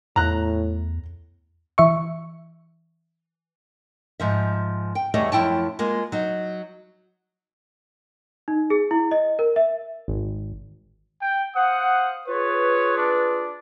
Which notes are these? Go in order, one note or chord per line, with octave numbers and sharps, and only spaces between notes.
E2 A2 A#5 F#6
E3 E5 C#6
G#2 F3 E5
G5
E2 G3 A3 G#4 C#5 D#5
F#2 F3 E4 G5 A5
G#3 A#3 F4
F#3 D#4
D#4
G#4
E4
D#5
A#4
E5
G#1
G5
C5 F5 F#5 D#6
F4 G#4 B4 C#5
D4